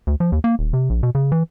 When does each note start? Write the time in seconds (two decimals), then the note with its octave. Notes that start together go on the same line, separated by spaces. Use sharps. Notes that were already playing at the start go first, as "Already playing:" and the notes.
0.07 D2
0.20 F3
0.32 D#2
0.44 A#3
0.59 D#1
0.73 C3
0.90 A#1
1.03 B2
1.15 C#3
1.32 E3